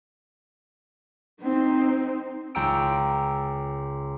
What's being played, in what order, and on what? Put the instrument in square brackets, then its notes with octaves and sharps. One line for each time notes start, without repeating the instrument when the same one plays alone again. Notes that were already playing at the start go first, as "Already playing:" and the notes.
[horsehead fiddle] C4 D#4
[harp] C#2 C#4 G5 A#5 E6 D7